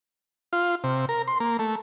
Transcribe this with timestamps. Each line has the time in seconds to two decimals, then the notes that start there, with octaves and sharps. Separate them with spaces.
0.53 F4
0.84 C3
1.09 A#4
1.28 C6
1.40 A#3
1.59 A3